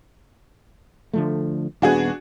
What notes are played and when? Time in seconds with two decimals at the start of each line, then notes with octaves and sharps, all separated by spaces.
1.13 D3 F3 A3
1.82 D#1 B3 D4 F#4 G#4